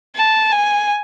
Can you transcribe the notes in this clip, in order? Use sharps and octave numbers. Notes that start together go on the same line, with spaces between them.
A5
G#5